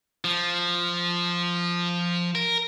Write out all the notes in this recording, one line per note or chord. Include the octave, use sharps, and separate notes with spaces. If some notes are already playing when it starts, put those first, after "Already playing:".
F3
A#4